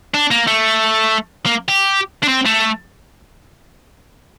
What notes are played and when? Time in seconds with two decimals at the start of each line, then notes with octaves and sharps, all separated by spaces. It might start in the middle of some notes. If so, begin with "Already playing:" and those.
0.14 D4
0.31 A#3
0.47 A3
1.46 A#3
1.68 G4
2.23 D4
2.28 C4
2.45 A3